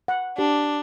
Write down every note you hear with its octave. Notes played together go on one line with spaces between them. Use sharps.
F#5
D4 G4